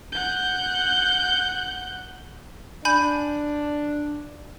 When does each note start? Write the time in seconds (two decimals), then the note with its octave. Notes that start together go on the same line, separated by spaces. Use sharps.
0.12 F#5 G6
2.85 D4 G#5 B5 G6